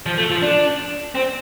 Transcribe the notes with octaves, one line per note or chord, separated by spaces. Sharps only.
F3
A3
F3
D4
C4